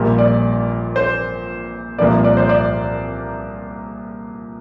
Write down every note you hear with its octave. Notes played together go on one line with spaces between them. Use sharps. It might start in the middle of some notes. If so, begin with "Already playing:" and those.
Already playing: A#1 A#2 G3 A#3
D5
C5
C2 A#2 F3 A#3 D5
D5
C5
D5